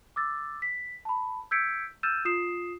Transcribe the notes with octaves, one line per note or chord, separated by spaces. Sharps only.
D6 E6 A6
B6
A5 B5
E6 G6 G#6 B6 C#7 D7
E6 F6 G6 A6 D#7 E7
F4 D#6 C7 E7